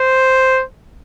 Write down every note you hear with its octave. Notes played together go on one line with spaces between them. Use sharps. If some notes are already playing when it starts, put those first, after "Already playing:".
Already playing: C5